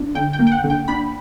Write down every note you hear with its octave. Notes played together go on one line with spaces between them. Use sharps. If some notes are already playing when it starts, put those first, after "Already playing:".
Already playing: D4
D3 G5
G5
A#3
G5
F#5
D3
G5
D4 B5